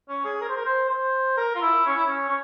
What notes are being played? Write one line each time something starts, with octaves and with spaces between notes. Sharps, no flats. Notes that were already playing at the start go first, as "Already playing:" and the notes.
C#4
G#4
A#4
C5
A#4
C5
C5
A#4
F4
E4
C#4
E4
C#4
C#4